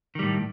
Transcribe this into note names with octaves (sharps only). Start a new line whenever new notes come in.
A2 D#3 G3